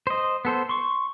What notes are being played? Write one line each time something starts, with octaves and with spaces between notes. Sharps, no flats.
C5 D#5
B3 A4 C5
C6 C#6